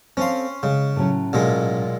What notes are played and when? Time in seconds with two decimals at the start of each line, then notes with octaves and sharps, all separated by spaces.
0.17 C4 C#4 A4 F5 C6
0.63 C#3 G#3
0.96 A2 F#3 C#4
1.33 B1 A#2 G#3